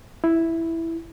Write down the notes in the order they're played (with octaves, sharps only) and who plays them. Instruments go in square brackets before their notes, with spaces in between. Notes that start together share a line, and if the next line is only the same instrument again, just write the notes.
[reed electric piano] E4